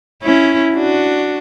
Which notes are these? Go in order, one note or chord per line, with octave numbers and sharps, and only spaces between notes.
C#4 E4
D4 F#4